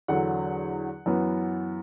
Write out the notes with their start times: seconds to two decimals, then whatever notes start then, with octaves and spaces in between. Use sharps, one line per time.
0.08 E2 D3 F#3 F#5
1.06 F#2 E3 B3